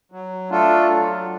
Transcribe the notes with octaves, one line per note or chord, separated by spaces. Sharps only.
F#3
A3 D4 F4 A4
F#3